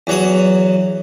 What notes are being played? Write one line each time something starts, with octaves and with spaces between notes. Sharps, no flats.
E2 F#3 D#6